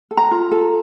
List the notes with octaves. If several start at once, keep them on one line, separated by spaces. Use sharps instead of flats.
A4
A#5
F4
A4